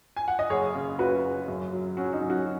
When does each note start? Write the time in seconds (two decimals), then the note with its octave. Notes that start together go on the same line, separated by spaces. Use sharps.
0.17 G#5
0.28 F#5
0.39 D#5
0.50 F#1 G#4 C#5
0.74 C#3
0.99 F#1 F#4 B4
1.23 F#1
1.48 F#2
1.73 F#3
1.97 F#3 C#4 F#4
2.13 D#4
2.22 F#2
2.30 C#4 F#4